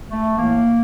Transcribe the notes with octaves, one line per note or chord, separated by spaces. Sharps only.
A3
A2 E3 A#3